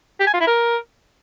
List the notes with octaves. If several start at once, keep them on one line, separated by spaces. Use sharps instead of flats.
G4
G#5
F4
E4
A#4